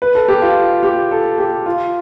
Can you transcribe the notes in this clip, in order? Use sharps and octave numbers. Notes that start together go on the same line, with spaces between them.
B4
A4
G4
F4
G4
A4
G4
F4